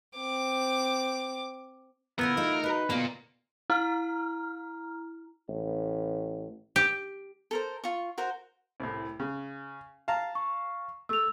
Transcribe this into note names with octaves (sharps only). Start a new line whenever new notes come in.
C4 D6
A#2 D3 B3 C#4 E4 A#4
A3 D#4 F4 A4
F#4 B4 D#5
B2 D3 A#3 F4 F5
E4 A#5 F6
A1
G4
A4 A#4 C5
F4 C#6
F#4 A#4 C5
C2 A2
C#3
F5 A5 A#5
C#6
A3 E6 F7